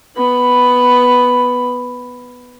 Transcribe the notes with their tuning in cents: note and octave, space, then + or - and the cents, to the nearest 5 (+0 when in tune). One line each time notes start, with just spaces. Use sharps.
B3 +0 B5 +5